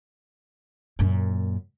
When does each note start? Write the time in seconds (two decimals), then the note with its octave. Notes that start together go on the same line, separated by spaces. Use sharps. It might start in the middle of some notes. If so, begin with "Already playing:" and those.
0.99 F#2 A#2